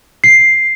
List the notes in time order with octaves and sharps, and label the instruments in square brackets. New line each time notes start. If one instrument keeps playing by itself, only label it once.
[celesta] C7